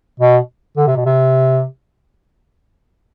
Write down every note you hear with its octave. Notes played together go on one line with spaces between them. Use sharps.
B2
D3
C3
B2
C3